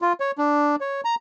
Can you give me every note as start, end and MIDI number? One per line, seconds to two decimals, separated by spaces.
0.02 0.13 65
0.20 0.31 73
0.38 0.76 62
0.81 1.01 73
1.05 1.15 82